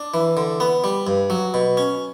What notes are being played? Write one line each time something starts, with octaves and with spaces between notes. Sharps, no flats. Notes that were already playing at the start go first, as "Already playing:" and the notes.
Already playing: D4
E3
D3
B3
G3
G2
F#3
B2
C#4